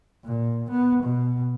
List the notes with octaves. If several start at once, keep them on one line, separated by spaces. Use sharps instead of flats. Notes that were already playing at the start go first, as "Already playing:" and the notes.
A#2
B3
B2